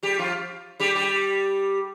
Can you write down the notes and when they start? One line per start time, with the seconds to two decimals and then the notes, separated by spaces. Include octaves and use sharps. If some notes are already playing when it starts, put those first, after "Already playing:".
0.03 G3 G4
0.19 F3 F4
0.80 G3 G4
0.95 G3 G4